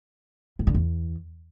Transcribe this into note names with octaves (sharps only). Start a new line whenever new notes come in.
G#2
D3
E2